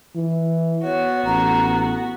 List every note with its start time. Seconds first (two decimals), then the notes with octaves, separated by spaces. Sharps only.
0.16 E3
0.83 B3 F#4 C#5
1.25 A1 A#5